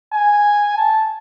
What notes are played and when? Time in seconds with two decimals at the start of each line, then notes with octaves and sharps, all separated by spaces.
0.13 G#5
0.77 A5